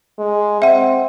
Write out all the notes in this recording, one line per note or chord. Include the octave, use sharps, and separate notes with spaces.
G#3
C4 E5 F#5